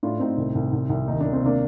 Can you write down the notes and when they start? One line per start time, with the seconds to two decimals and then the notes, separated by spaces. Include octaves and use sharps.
0.03 A2 D4 F4
0.20 A2 C4 D#4
0.38 C2
0.55 C2
0.73 C2
0.90 C2
1.08 D#2 D#4
1.20 D4
1.26 D#2
1.33 C4
1.42 C3 A#3 D4